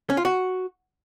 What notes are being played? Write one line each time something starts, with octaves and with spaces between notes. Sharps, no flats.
C#4
F4
F#4